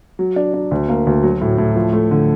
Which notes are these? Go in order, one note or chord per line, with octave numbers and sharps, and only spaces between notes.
F#3
D4
D4
D2
A#3
D2
F#3
A2
A2
F3
A3
D3